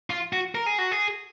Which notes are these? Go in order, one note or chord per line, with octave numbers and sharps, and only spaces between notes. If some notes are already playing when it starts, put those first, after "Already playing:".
F4
F#4
A#4
G#4
F#4
G#4